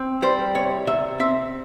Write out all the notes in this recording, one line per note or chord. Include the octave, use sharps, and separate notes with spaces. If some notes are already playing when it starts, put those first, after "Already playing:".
Already playing: C4
G3 C5
C2 C#5
C3 E5
C4 E5